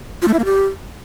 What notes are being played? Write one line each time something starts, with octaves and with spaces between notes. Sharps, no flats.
F4
A3
E4
A#3
G4